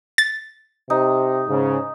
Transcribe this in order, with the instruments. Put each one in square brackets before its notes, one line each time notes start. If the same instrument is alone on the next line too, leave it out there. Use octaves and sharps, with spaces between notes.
[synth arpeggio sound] A6
[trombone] C3 [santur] D#4
[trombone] G#2 [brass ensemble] C#3